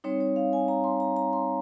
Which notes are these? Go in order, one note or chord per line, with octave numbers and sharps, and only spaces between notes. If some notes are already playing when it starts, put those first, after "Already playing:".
G3 C4 D#4 C#5
C#5
F5
G#5
A#5
C6
A#5
A#5
C6